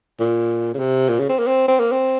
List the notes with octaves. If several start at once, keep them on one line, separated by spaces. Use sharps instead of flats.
A#2
C#3
C3
A#2
C#3
C4
A#3
C4
C4
A#3
C4